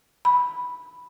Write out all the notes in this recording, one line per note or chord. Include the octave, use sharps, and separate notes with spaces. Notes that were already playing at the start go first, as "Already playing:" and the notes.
B5